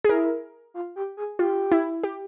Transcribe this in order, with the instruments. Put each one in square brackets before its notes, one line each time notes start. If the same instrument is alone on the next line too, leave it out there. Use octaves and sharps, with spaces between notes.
[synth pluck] G#4
[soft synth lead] E4 [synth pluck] A#4
[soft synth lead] F4
G4
G#4
[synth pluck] F4 [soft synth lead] G4
[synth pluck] E4
G4